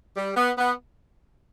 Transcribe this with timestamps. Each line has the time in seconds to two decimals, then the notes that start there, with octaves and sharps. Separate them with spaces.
0.17 G3
0.36 B3
0.58 B3